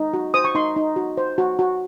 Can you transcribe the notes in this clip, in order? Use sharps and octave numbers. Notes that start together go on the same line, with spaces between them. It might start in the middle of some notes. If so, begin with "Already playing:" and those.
Already playing: D#4
F#4
C5 D#6
C#6
D#4 C6
D#4
F#4
C5
F#4
F#4